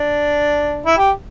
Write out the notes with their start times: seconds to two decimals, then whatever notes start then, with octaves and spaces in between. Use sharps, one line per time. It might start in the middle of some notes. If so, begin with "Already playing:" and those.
Already playing: D4
0.86 E4
0.98 G4